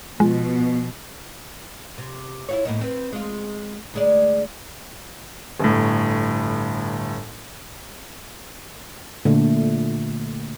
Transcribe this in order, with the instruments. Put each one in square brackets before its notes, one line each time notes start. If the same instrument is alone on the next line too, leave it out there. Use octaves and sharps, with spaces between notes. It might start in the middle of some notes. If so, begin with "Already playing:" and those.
[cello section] B2 [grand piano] F3 [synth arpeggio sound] G#3
[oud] C3
E4 F4 C#5
A2 A#3 D#4
C4 B4
G#3 F4
D2 G#3 D5
[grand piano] G1 A2
[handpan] A#2 D3 A3